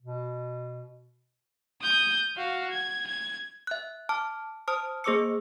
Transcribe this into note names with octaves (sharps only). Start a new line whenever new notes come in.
B2
D#6 G6
F#4 F5
G#6
G#6
E5 F#6
A5 D6 F6
C5 A5 D#6 F6
A#3 G#4 C5 D6 E6 C#7